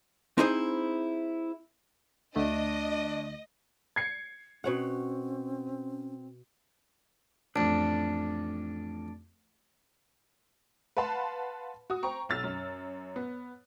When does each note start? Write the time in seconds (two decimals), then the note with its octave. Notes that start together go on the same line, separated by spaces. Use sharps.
0.38 C4 D#4 E4 G#4 C5
2.36 D2 A3 D4 D#5
3.96 G#6 C7 C#7
4.64 B2 C4 C#4 C#5 F#5
7.56 A1 F2 D4
10.97 B4 F5 F#5 A5 B5 C6
11.90 F#4 D#6
12.03 C5 G5 A#5 C#6
12.29 B1 E6 F6 A6
12.44 F#2
13.16 B3